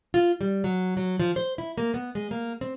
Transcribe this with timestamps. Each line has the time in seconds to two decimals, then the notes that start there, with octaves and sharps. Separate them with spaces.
0.14 F4
0.41 G3
0.64 F#3
0.97 F#3
1.20 F3
1.36 C5
1.58 E4
1.78 A#3
1.94 B3
2.15 G#3
2.31 A#3
2.61 C4